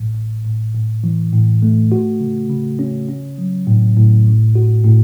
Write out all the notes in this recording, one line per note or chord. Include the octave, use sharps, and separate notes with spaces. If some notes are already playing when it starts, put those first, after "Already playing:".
Already playing: A1 A2
A1
A2
A2
E3
A2
A3
F#4
C#3
C#3
C#4
C#4
F#3
A2
A2
A1
F#4
A2